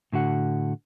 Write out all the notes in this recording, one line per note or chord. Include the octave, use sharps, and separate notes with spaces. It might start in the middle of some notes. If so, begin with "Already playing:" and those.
A2 D3 F#4 F#5